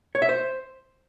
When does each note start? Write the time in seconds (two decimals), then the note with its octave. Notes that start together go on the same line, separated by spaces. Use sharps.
0.15 C#5
0.22 E5
0.29 C5